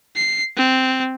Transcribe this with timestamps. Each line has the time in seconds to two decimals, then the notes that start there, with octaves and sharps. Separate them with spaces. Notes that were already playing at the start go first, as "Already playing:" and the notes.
0.16 C7
0.57 C4